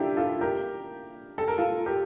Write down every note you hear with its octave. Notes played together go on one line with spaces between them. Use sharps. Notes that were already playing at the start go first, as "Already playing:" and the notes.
Already playing: D4 E4 F4 G4 A4 A#4
F4 A4
G4 A#4
A4
A#4
F4 A4
G4 A#4